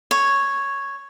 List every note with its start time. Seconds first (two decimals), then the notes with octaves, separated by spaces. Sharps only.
0.11 C#5